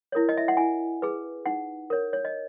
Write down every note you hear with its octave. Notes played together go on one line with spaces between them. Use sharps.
E4 A#4 C#5
D#5
E5
F#5
E4 G#5
G#4 B4
D#4 F#5
A#4 C#5
C#5
D#5